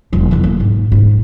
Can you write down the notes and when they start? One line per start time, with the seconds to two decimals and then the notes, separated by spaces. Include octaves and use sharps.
0.13 E1 F#3
0.31 E2 D3
0.44 A#3
0.60 G#2
0.92 G#2